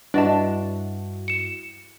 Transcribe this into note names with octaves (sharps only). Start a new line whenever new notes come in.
G2 D4 E4 F#4 B4 D#5 A5
C#7 E7